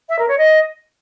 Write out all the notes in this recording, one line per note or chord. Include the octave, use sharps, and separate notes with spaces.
E5
A#4
C#5
D#5